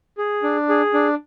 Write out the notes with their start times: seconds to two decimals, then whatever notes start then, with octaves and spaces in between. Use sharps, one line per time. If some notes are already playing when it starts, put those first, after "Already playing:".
0.18 G#4
0.43 D4
0.69 G#4
0.94 D4